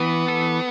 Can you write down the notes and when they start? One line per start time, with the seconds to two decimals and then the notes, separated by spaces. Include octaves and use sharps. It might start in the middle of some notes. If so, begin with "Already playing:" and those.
Already playing: E3 B3
0.28 A4